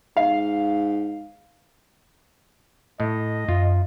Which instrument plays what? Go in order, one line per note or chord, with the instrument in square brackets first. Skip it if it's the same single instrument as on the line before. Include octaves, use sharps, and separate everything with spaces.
[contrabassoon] G#2 [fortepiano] F5
[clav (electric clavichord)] A2 [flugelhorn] D#5
[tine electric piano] F#2 [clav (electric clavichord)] F4